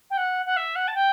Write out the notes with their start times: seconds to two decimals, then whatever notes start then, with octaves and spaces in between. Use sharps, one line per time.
0.10 G5
0.17 F#5
0.46 F#5
0.56 E5
0.75 F#5
0.87 A5
0.94 G5